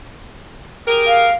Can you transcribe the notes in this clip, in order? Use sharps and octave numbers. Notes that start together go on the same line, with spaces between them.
G4 G#4 A#4
F5